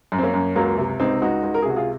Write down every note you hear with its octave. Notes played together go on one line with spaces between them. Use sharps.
F#2
C4
A#3 C#4
F#2
C#2 F#3 A#3
C3
C#2 C4 D#4
C#2 D#4 F#4
C#2
A#4
G#4
C3 F#4
F4 G#4